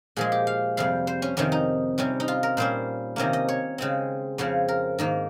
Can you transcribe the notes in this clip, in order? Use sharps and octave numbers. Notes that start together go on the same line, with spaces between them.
A#2 F3 G#3 G#4
G4
F5
F2 C3 G3 F5
C5
C#4
F2 C3 D#3 C#4
D#4
C3 G3 C#4
D#4
F4
A#4
A#2 G3 C#4 C5
C3 D#3 A#3 C#4 D#5
D#5
C#5
C#3 G#3 C4
F2 C#3 F3 C4 C#5
A#4
G#2 D#3 A#3